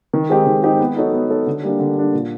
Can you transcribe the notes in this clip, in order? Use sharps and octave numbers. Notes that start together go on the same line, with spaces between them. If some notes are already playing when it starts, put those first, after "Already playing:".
D#3
G#3 C4 D#4 G4
D#3
G#3 C4 D#4 G4
B3
D#4 F#4 A4 C#5
B3
D#4 F#4 A4 C#5
D3
G3 A#3 D4
D3
G3 A#3 D4
A#2